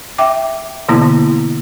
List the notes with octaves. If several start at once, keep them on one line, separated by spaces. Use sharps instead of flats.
E5 G5 D6
B2 D3 E3 A#3 B3 E4